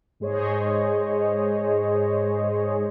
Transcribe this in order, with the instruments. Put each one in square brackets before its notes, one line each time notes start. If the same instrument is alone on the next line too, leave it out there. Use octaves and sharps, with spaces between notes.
[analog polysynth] G#2 G#3 G#4 C5 C#5 D#5